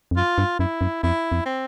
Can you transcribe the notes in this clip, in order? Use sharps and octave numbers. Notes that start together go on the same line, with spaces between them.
F2
F#2 F4
G2
F#2 E4
F#2
F2 E4
F2
C4